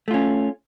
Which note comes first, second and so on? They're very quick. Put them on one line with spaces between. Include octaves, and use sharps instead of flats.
A3 F4 C#4